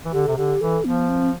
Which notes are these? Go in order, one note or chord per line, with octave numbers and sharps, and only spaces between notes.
E3
D3 G4
C3 A4
D3 G4
E3 A4
F3 B3
C4